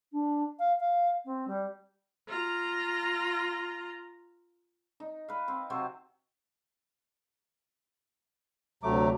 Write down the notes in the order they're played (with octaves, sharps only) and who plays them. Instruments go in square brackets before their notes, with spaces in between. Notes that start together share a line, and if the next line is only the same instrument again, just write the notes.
[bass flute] D4
F5
F5
C4
G3
[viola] F4 A#5
[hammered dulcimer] D#4
B4 F5
C4
C3 F#3 C4 C5
[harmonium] D2 C3 F#3 [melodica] A3 D6 [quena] A#5